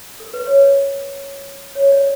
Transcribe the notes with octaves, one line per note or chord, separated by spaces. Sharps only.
A4
B4
C#5
C#5
D5